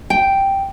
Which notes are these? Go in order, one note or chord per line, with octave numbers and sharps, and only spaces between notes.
G5